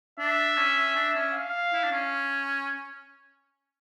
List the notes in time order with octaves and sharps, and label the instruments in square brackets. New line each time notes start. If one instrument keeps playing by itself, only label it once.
[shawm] D4 [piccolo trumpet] E5
[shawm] C#4
D4
C#4
[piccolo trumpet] F5
[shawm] E4
D4
C#4